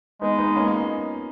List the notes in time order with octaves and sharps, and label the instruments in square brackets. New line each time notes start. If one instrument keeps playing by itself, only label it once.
[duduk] G#3 [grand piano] B3 D#4
[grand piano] B3 D#4
A#3 C#4
A#3